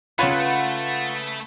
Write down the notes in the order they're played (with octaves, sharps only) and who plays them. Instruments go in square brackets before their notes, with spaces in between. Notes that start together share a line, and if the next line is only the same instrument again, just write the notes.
[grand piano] C#3 B5 [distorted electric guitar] A3 [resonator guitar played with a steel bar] F4 [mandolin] B4 C#5 F#5